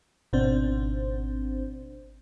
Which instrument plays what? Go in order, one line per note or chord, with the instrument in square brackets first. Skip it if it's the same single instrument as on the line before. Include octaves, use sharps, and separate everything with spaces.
[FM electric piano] G#1 B2 C4 D4 C5